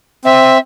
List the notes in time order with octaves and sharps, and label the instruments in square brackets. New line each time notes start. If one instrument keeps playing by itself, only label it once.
[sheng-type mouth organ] C4 [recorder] E5